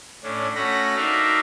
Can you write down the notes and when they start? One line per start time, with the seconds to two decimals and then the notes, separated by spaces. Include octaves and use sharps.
0.23 A2 C#4 D4
0.55 A3 C#4 F#4 B5 A#6
0.96 D4 D#4 F#4 A#4 E5 F5